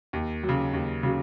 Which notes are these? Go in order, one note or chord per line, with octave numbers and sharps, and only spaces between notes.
D#2
F#3
C#3
D#2
C#3 F#3